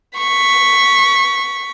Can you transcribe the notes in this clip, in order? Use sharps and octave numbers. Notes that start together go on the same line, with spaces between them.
C#6 B6